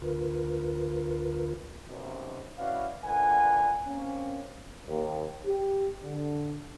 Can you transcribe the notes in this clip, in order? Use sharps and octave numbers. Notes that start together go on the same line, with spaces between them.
D2 D3 F4 A#4 B4
B1 F#2 C3
C#4 E4 F#4 B4 D5 F5
D2 A#2 D3 B4 F#5 G#5
A#3 C4 C#4
D#2
G4
D3